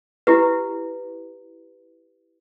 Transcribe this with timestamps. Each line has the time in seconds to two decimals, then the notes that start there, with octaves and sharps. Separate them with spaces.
0.27 E4 G4 B4